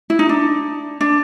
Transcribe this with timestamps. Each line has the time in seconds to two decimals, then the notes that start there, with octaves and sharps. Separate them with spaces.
0.10 E4
0.19 D#4
0.29 D4
1.01 D4